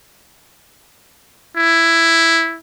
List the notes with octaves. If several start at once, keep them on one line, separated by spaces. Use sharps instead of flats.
E4